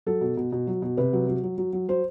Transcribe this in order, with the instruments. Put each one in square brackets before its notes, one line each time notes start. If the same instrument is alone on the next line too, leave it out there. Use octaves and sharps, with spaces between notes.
[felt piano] F#3 A4
B2
B2
B2
F#3
B2
C3 B4
F#3
F#3
F#3
F#3
F#3
F#3 C5